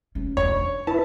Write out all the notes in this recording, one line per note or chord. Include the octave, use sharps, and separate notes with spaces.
E3 C#4
E2 G2 C#5
D4
E4 B4 A5